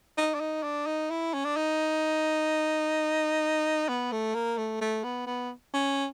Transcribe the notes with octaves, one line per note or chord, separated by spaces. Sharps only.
D#4
D4
D#4
D4
D#4
E4
C#4
D4
D#4
B3
A3
A#3
A3
A3
B3
B3
C#4